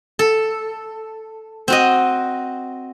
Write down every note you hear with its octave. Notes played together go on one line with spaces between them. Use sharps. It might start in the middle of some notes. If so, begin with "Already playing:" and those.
A4
C4 F#4 D#5